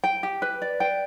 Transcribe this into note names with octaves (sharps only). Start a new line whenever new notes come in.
G5
G4
B4
D5
G5